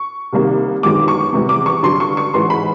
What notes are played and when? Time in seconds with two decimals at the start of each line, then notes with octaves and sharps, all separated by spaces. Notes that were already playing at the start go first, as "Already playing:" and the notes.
Already playing: C#6
0.33 C2 C3 D#3 G3 A#3
0.83 G1 F#2 D#3 G#3 D6
1.08 C#6
1.32 E2 C3 E3 G3
1.49 D6
1.66 C#6
1.83 G2 D3 F#3 C6
2.00 C#6
2.17 C#6
2.34 A1 G#2 E3 C6
2.50 B5